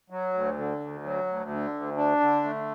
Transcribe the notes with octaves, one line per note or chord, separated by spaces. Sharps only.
F#3
D2
D3
D2
F#3
D2
D3
D2
D4
D3
A3